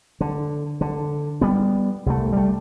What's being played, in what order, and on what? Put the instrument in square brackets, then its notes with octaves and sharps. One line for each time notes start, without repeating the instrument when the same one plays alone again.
[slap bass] D3
D3
G3 B3
C2 A3
G3 A3